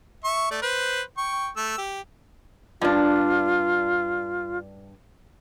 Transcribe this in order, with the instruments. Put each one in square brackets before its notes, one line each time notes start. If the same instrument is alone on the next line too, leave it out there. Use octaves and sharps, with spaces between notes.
[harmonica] E5 C#6
A3 D5
B4 C5
G5 C#6
A3 E6
G4
[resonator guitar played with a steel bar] G2 D4 [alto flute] F4